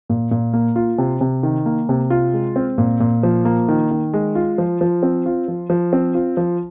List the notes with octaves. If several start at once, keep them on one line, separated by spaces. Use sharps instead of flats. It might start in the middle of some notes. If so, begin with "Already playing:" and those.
A#2
A#2
A#3
F4
C3
C3
D#3
A#3
C3
F4
G#3
C4
A#2
A#2
F3
A#3
D#3
D#3
G#3
F4
F3
F3
C4
F4
F3
F3
C4
F4
F3